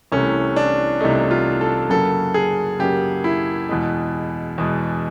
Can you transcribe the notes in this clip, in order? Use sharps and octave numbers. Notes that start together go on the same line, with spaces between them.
C2 C3 E3 A3 C#4
D4
C2 C3 E3 A3 D#4
F4
A4
F#2 C#3 F#3 A#3 A4
G#4
F#2 C#3 F#3 A#3 G4
E4
E2 B2 G#3
E2 B2 G#3